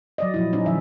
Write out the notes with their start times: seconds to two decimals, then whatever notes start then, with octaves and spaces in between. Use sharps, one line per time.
0.18 F#3 D5 D#5
0.34 A#2 F3 E4
0.53 G3 C#4 D#4
0.66 D#3 F3 E5